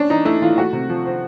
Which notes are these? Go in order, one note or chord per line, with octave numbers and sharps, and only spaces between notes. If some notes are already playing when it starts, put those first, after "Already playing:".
Already playing: C#4 D4
E3 D#4
A3 E4
E3 F4
A3 F#4
C3
F3
C4